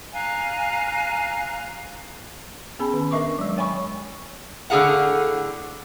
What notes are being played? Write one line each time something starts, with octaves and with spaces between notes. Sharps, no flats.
F5 G#5 A#5 F#6
B3 C#4 G#4 A5 B5
D#3
D4 A#4 D#5 E5 C#6 D6
F#3 G#3
C#5 G5 G#5 B5 C#6
A2 D3 D4 G#4 F5 F#5